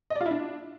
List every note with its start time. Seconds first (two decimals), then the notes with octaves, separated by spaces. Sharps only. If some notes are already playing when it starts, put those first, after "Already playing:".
0.10 D#5
0.16 D5
0.21 F4
0.26 E4
0.31 D4